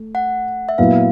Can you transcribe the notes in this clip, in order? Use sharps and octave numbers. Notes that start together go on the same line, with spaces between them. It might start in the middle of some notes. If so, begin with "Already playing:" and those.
Already playing: A3
F#5
E5
A#2 F#3 B3 E4 F5